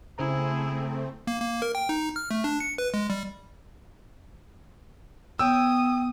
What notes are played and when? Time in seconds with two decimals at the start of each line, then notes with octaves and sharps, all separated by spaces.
0.18 C#3 A3 C4 E4 G#4 C5 A#5
1.27 A#3
1.41 A#3
1.62 A#4
1.75 G5
1.89 D#4
2.16 F6
2.31 A3
2.44 D4
2.60 C#7
2.78 B4
2.94 G#3
3.10 G3
5.39 B3 C#5 G5 D#6 E6